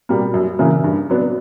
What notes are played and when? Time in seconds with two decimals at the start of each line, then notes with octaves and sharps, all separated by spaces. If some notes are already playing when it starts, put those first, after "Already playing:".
0.09 B2 G3 A#3
0.34 F#2
0.59 C#3 E3 A#3
0.84 G2
1.10 F#3 B3 D4